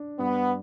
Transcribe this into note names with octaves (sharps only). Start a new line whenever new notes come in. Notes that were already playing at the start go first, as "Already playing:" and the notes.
Already playing: D4
G2 B3